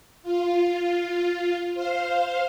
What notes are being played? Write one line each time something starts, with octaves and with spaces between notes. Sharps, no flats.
F4
C5 F5